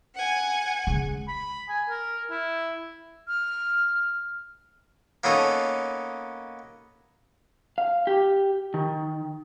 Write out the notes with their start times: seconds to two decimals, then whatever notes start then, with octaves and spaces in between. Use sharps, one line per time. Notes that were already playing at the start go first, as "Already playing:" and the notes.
0.14 F#5 G#5
0.87 C#3 G#3
1.28 B5
1.69 G#5
1.89 A#4
2.31 E4
3.28 F6
5.24 A#3 B3 C#4 D#4 A4
7.78 F5
8.07 G4
8.74 D#3